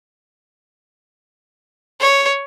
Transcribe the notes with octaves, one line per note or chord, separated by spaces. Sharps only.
C#5